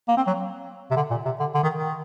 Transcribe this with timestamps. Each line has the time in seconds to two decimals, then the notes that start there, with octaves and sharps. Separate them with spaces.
0.08 A#3
0.17 C4
0.27 F#3
0.91 C3
0.96 D3
1.11 A#2
1.25 C3
1.40 D3
1.54 D3
1.63 D#3
1.74 D#3